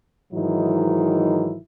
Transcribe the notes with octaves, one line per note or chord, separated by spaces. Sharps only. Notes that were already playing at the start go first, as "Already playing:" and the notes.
G#2 D#3 E3 F#3 D#4 E4